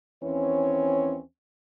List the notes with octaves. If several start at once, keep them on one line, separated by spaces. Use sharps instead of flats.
D#2 E3 C4 C#4 C#5